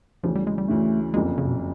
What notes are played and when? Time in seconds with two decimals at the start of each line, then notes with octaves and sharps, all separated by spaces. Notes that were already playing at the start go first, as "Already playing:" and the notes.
0.23 D2 C#3 E3 F3
0.35 G3
0.47 G#3
0.58 G3
0.68 D2 C#3 E3 A3
1.14 F#1 F2 D3 F3 G#3 A#3
1.38 C#3
1.48 B2